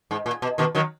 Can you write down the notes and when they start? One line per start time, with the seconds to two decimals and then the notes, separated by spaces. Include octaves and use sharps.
0.11 G#2
0.26 A#2
0.42 B2
0.58 B2 D#3
0.75 D#3 F#3